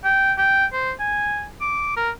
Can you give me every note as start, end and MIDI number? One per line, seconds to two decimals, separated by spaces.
0.04 0.33 79
0.38 0.66 79
0.73 0.92 72
0.99 1.47 80
1.61 1.96 86
1.96 2.10 70